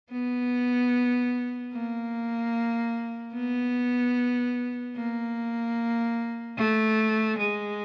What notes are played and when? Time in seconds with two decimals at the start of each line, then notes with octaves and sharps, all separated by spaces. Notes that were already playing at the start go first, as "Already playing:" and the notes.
0.11 B3
1.73 A#3
3.34 B3
4.96 A#3
6.57 A3
7.38 G#3